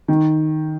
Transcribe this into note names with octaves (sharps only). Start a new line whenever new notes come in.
D#3